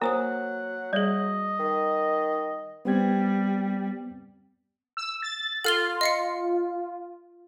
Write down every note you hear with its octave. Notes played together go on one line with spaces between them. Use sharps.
F#3 A#3 A#4 C5 F#5 A#5 D#6
G3 G#4 D5 D#5
D#3
G3 B3 C4 G#6
E6
A6
F4 A4 F6 G7
D#5 F5 C#7